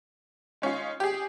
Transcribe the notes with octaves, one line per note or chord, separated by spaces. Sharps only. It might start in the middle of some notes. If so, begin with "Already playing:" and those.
G#3 C#4 D#4 F4
G4 G#4